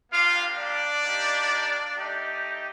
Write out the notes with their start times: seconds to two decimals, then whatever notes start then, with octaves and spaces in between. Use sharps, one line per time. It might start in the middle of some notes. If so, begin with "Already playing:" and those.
0.12 A#3 D4 F4 G4 F5
0.57 D4 D5
1.03 A#3 D#4 G4
1.95 A3 D#4 G4